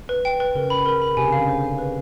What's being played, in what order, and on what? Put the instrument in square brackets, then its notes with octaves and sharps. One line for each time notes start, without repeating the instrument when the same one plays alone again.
[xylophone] B4
G5
B4
[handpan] C#3 [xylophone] A#4
[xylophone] B5
A#4
B5
[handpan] C3 [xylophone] G#5
[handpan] C#3
[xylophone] F5
[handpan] D3
[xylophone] C5
F5
B4